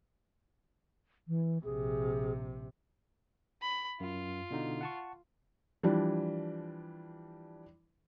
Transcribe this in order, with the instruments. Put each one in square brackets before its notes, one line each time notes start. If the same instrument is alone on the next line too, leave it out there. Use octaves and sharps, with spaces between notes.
[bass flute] E3
[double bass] A#1 C3 [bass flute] G#4
[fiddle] B5
[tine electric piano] F#2 [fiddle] F4
[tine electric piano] B2 D3 D#4
F#5 A5 C#6
[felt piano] E3 F3 G3 D4